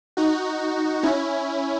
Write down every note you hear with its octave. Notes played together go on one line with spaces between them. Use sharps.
D#4 F#4
C#4 E4